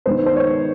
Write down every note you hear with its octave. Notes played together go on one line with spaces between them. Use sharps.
D#3 G#3 B3 C5
C5
C#5